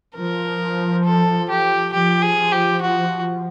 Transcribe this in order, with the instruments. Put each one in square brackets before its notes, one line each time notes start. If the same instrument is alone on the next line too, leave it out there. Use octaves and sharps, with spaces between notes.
[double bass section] F3 [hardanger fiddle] A#4
[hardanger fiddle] A4
G4
[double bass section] F3 [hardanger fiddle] G4
[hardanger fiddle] G#4
G4
F#4